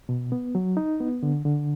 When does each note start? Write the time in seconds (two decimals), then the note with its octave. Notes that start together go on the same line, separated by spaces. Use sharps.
0.09 B2
0.32 B3
0.55 F#3
0.77 D#4
1.00 B3
1.23 D3
1.45 D3